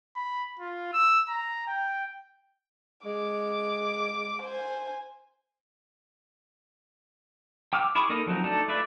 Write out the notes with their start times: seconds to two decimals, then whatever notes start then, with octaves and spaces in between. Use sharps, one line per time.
0.16 B5
0.59 F4
0.93 E6
1.28 A#5
1.67 G5
3.05 G#3 D6
4.42 C5 G#5
7.73 G5 D6 E6 F6
7.95 E4 G#4 B5 C#6 D6
8.09 A#3 D#4 A4 A#4 D#5
8.26 F3 F#3 C4 D#4
8.44 A3 D4 D#4 A4
8.68 A3 F4 B4 D5 E5